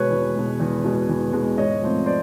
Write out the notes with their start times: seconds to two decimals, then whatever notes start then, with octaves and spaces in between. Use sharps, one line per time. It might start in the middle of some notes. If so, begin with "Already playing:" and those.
Already playing: B2 G#3 B4 C#5
0.10 E2
0.35 B2 G#3
0.60 E2
0.84 B2 G#3
1.09 E2
1.33 B2 G#3
1.57 G#2 C#5 D#5
1.82 F3 A3 C4
2.06 C5 D5